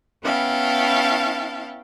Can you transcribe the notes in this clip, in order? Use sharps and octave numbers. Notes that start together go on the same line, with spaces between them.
B3 C#4 E4 F5 G5 A5